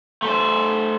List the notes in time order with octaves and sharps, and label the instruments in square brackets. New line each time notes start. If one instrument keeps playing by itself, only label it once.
[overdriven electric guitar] A3 C5